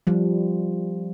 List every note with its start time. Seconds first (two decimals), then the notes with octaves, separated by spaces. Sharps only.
0.07 F3 G3